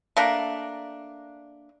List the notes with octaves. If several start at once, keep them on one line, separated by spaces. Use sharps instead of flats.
A3 A#3 D4